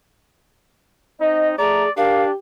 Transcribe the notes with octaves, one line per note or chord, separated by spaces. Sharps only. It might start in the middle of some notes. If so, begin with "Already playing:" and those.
C4 D#4 D#5
A3 G#4 D5 A#5
D4 G4 A#4 F5